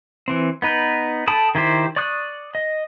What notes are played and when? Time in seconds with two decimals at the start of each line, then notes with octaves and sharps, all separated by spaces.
0.28 E3 C4
0.62 B3 D#4 B4
1.27 A4 G5 A5 B5 D#6
1.55 D#3 E4 G4 C5
1.96 D5 C#6 D#6 F#6
2.55 D#5